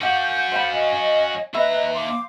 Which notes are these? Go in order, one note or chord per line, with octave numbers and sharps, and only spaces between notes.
C#4 F#4 F5 F#5 C#6 D6 G6
C5 F5 B5
D#5 G#5
D#2 B4 D#5 E5 A#5 B5
F5 C6 D6